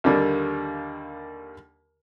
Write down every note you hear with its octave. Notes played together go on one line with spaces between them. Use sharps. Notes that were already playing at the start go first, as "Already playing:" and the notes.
D#2 D3 G3 A#3